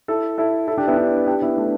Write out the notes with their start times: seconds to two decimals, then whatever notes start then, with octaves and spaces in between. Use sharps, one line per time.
0.08 E4 A4
0.38 E4 A4
0.68 E4 A4
0.78 D4 G4
0.87 B3 E4
0.97 D4 G4
1.27 D4 G4
1.42 B3 E4
1.57 A3 D4